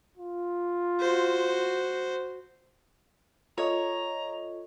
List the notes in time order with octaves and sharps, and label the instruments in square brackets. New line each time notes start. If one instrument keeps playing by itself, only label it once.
[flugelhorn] F4
[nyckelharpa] F#4 C5
[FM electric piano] F4 A4 D#5 [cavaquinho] C#5 [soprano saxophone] A#5